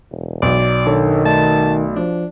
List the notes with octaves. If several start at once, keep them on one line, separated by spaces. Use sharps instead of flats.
E1
B1 D5
D#3 D4 A4 C#5
A3 D5 A5
F3 D4